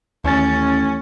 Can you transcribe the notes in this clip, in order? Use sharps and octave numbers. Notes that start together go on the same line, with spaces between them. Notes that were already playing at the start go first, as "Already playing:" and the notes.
A1 D#2 C#4 A6